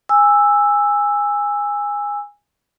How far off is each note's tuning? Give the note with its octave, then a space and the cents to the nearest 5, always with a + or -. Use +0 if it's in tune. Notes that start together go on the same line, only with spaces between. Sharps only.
G#5 -15 E6 +0